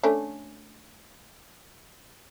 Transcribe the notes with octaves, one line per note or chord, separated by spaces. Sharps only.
A3 C#4 D4